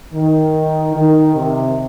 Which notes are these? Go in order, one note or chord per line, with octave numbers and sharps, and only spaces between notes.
D#3
D#3
C3